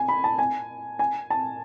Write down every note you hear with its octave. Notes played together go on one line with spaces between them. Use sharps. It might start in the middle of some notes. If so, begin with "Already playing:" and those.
Already playing: G#5
B5
A5
G#5
G#5
A5